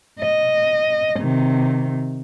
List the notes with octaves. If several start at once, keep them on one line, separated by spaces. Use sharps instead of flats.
D#5
C3 D#3